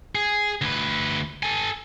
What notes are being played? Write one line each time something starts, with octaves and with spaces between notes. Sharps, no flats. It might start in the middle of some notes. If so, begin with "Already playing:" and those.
G#4
D2 B4
A4 G#5